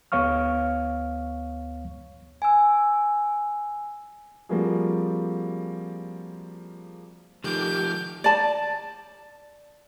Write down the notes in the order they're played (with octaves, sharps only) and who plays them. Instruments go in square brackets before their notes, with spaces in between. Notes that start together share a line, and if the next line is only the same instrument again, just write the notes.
[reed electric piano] D2 B3 C#5 F5 C#6 F6
[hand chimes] G#5 E6
[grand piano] F3 G3 A#3 C4 F#4 G#4
[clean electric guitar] D#3 [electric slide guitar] F3 A3 [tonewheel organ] G4 D6 F6 [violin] G6
[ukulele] D5 A5